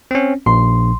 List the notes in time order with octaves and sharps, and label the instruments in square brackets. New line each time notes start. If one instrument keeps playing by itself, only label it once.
[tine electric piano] C4 C#4
[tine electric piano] A#1 [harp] C6